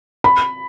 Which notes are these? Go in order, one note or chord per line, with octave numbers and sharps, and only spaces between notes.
B5